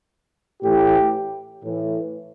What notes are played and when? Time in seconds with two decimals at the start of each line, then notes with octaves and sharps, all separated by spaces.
0.63 A2 E3 G4
1.63 A2 E3